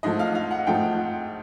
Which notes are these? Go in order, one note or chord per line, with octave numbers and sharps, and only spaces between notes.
G#2 F3 A3 D#5
F5
F5
F#5
G#2 F3 A3 G5